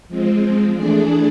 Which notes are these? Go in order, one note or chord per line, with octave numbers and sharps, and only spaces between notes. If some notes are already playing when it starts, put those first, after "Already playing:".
F3 G#3 C4
E3 A3 D4 G#4 D5